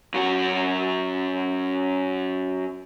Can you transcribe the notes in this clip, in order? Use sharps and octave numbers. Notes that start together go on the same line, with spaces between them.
F#2 F#4